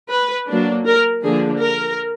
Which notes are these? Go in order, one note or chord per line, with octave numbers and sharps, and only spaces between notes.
B4
F#3 A#3 D4
A#4
D3 F3 A#3 D4 G#4
A#4